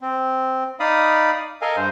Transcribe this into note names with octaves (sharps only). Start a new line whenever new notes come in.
C4
D#4 D5 F5 B5 D#6
A4 A#4 D#5 F5 G#5
G2 C5